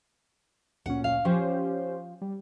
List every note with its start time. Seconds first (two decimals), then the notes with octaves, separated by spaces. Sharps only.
0.86 D2 A#2 C#4 F#5
1.04 F5
1.25 F3 C#4 G4 C5
2.22 G3